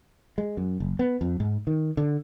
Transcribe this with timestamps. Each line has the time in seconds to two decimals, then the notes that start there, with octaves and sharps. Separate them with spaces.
0.38 G#3
0.57 F#2
0.80 F#1
0.99 B3
1.21 F2
1.40 G#2
1.67 D#3
1.97 D3